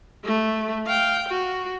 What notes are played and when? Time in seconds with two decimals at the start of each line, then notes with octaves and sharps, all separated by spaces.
0.24 A3
0.87 F5 G5
1.29 F#4